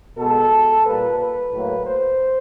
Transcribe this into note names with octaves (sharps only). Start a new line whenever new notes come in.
B2 G#3 A4
A#2 G3 A#3 B4
B4
A2 F#3 A#3
C5